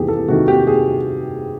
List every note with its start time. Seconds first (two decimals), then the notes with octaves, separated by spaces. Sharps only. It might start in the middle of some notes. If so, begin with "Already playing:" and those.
Already playing: E2 C3 D#3 G4 G#4
0.08 A4
0.28 C3 D#3 F#4
0.48 G4
0.67 G#4